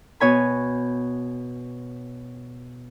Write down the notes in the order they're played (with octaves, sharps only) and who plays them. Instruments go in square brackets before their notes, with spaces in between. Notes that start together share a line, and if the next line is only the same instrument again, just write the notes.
[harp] B2 C#5 G#5 B5